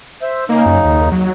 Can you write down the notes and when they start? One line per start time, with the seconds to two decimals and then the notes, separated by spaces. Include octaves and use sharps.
0.22 C5 E5
0.49 C#3 A#3 D#4
0.66 F#2
0.85 D#2
1.12 F#3